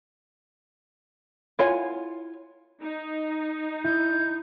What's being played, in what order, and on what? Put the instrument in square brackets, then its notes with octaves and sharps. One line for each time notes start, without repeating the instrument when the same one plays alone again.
[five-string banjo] E4 F4 C#5 F#5 G#5
[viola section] D#4
[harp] E4 [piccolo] G6